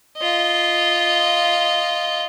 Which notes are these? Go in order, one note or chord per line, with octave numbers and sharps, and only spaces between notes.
F4 D#5